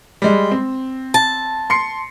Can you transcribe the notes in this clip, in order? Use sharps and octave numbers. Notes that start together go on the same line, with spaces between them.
G3 G#3
C4
A5
C6 C7 C#7